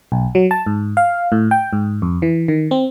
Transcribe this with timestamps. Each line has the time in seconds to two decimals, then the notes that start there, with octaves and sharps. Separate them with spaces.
0.12 B1
0.35 F#3
0.51 A5
0.66 G#2
0.97 F5
1.32 A2
1.51 G5
1.73 G#2
2.02 F2
2.22 E3
2.48 D#3
2.71 C4